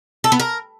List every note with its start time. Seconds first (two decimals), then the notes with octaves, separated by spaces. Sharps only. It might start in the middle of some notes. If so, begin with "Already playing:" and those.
0.24 A4
0.32 B3
0.40 A#4